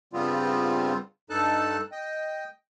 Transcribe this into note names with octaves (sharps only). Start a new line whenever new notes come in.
G2 C#3 G3 B3 C4 F4
G2 D#4 A4 A5 F#6
D#5 G5